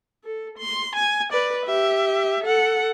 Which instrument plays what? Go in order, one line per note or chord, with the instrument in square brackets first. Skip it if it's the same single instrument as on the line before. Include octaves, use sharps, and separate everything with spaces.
[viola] A4
C6
G#5
B4 D5
G4 E5
A4 F#5